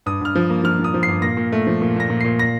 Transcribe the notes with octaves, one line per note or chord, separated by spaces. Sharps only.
G2 D#6
G2 F6
F3
A#3
F3 F6
F3
D#6
F3
C7
G2
A#2 A#6
A#2
A3
F3
A#2
A#2 A#6
A#2
A#2 C7
A#6